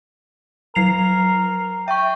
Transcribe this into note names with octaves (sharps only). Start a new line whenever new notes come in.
F#3 A#4 C7 F7
E5 G5 C#6